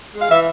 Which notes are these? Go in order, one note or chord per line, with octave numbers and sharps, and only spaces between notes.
G#3
F5
E3 E5